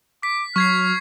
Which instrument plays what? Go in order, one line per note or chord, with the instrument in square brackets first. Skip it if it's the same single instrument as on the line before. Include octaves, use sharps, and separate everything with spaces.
[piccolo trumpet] D6 [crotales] B6
[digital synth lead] F#3 [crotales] C#6 G#6 C7 [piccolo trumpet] F6